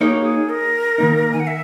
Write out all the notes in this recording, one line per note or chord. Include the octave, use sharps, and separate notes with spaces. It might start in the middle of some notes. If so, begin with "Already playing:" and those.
A#3 D#4 G#4 A#4 C#5
F#4
G#4
A#4
D#3 A#3 D#4
G#5
F#5
E5